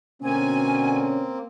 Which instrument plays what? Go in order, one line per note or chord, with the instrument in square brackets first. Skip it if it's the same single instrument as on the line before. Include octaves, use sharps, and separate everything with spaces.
[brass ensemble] B2 D3 C#4 [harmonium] A#3 C4 [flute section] G#5